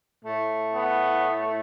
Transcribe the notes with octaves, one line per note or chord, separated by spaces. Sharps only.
A2 A3
B3